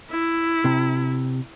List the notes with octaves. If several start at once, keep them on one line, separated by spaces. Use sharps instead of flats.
E4
C3